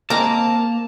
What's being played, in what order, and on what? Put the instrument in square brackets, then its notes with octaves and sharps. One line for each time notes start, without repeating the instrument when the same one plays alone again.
[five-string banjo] G#3 C4 A#4 [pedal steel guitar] A#3 [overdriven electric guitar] A5 [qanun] A#5 D6